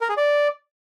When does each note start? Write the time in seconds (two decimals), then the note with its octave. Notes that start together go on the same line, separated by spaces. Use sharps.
0.01 A#4
0.09 G#4
0.17 D5